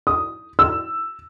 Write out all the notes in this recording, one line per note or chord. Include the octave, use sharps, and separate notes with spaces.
D#6
E6